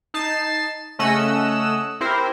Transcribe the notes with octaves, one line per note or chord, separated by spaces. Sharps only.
D#4 A5 C7 E7
C#3 A3 C#4 D#5 F#5 E6
C4 E4 G4 A#4 C5